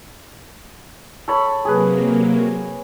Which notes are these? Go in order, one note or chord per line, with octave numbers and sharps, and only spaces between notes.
A4 C#5 B5
C3 F#3 A#3 G#4 B4